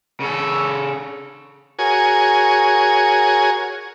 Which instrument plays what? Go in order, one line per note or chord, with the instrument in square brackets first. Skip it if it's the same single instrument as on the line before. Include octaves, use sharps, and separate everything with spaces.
[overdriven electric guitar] C#3 A4
[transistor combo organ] F#4 G#4 A#4 C#5 G#5